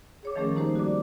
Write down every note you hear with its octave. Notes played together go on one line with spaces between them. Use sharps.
G#4 C#5 D6
D#3 F3 A3 C#4 G#4 A#4
G3 A#3 D#4 G4 C5
F#4 D5 D6